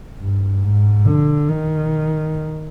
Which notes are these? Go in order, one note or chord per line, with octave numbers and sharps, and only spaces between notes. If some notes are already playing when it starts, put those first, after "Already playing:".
G2
G#2
D3
D#3